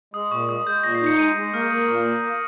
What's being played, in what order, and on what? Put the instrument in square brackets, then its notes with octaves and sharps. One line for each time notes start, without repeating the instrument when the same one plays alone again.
[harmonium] G#3 [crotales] D#6
[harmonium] A#2 [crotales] C#6
[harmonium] G#3 [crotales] D#6
[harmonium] G#3 [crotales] G6
[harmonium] A#2 [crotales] A#6
[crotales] C7
[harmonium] D#4 [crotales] C#7
[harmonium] G#3 [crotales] D#7
[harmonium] G#3
[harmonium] A#3 [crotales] F6
[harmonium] A#3 [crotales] D#6
[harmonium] A#2 [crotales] C#6
[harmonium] A#3